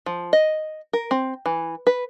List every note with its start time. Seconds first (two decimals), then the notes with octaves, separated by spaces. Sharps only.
0.06 F3
0.33 D#5
0.93 A#4
1.11 C4
1.46 E3
1.87 B4